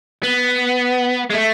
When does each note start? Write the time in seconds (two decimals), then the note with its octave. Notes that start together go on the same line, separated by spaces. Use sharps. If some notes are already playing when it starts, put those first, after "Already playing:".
0.24 B3
1.31 G#3
1.33 A3